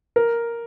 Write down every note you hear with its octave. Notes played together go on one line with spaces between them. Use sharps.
A#4